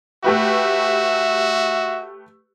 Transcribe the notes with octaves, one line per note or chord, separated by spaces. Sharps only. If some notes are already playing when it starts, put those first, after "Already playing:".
A3 F#4 G4 B4 E5